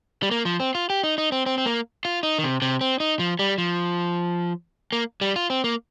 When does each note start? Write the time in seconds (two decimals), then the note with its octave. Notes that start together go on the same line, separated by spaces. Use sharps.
0.23 G3
0.31 A#3
0.45 F3
0.60 C4
0.75 F4
0.90 G4
1.03 D#4
1.18 D#4
1.32 C4
1.46 C4
1.58 C4
1.66 A#3
2.05 F4
2.23 D#4
2.39 D#3
2.43 C3
2.62 C3
2.81 C4
3.00 D#4
3.19 F3
3.39 G3
3.58 F3
4.92 A#3
5.21 G3
5.36 F4
5.50 C4
5.64 A#3